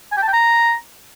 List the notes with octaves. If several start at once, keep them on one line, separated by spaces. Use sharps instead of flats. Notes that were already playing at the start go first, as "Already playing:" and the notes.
G#5
G5
A5
G5
A#5